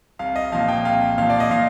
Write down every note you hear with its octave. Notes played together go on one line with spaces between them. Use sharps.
C2 F5
D#5
A#2 F3 F5
G5
C2 F5
A#2 F3 F5
D5
D#5
A#2 F5